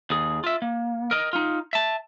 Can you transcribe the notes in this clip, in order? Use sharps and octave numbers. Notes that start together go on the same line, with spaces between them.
D#2 G#4
F4 E5
A#3
A#4 D#5
D#4 F4
E5 A5